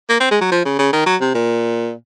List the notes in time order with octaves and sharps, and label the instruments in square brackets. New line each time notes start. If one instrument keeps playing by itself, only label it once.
[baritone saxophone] A#3
C4
G#3
F#3
F3
C#3
C#3
D#3
F#3
C3
A#2